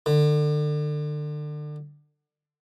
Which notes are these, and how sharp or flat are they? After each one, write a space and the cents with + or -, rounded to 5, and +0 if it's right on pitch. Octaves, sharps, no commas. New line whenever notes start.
D3 +30